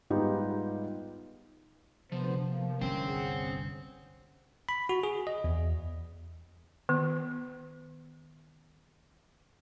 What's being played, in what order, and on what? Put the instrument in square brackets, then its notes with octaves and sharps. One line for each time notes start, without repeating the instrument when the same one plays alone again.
[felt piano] G#2 G3 B3 D#4 F4 G4
[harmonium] D2 B3 C5 [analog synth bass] C3 [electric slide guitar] F3
[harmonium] A#3
[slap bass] G1 C2 G2 [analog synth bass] C#4 [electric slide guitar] C5 G5
[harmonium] G#4 F#5
[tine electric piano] B5
F#4
G#4
D#5
E2
[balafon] D#3 B3